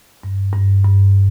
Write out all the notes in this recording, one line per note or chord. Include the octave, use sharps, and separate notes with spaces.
G2
G2
G2